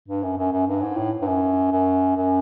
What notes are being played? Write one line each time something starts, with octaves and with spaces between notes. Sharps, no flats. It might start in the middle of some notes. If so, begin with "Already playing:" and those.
G2
F#2
F#2
F#2
G2
G#2
A2
G2
F#2
F#2
F#2